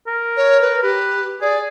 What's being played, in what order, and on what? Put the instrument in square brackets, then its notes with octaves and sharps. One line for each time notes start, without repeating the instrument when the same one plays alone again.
[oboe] A#4
[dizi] C#5
B4
[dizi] G4 [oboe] B4
[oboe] G#4 [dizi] D5